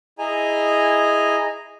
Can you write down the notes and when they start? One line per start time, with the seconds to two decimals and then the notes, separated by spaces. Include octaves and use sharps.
0.19 E4 G#4 D#5 G#5 A#5